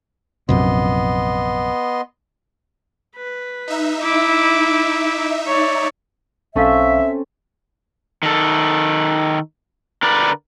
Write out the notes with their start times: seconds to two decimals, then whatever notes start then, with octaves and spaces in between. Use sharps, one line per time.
0.49 A#1 F#2 C3 B3 D#5 C6
3.16 B4
3.68 D#4 E5
4.01 E4 D6
5.47 C#5 D5
6.56 B1 C4 C#4 A4 E5 F5
8.23 D#3 A4
10.03 D3 A#4 B4 D5